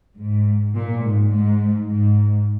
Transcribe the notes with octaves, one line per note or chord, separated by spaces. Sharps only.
G#2
A#2
G#2
G#2
G#2